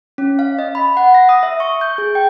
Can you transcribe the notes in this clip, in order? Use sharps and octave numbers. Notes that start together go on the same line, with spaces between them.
C#4
F5
D#5
B5
F#5
A#6
D#6
E5
C#6
G6
G#4
G5